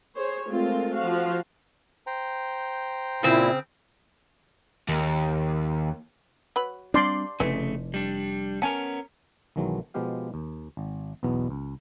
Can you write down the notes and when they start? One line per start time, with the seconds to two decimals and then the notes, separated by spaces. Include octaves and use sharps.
0.15 G#4 C5 C#5
0.48 G#3 A3 C4 F4 A#4
0.94 F3 F#4 F5
2.07 C5 G5 A#5
3.23 A#2 C#3 C4 E4
4.89 D#2
6.56 F#3 B4 B5
6.94 G3 C4 D4 D5 C6
7.40 F1 C#3 E3 A3
7.94 G3 D4
8.62 B3 C#4 A#4 G#5 A5
9.56 B1 D#3 E3 F#3 G#3 A3
9.94 B2 F3 G#3 B3 G4 F5
10.34 D#2
10.77 G#1
11.23 B1 E2 B2 B3
11.50 C#2